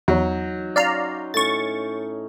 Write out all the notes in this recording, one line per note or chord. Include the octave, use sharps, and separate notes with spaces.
E2 F#3 D#4 C#5
C#4 D5 F5 A#5 C6
A2 C#4 C#6 A6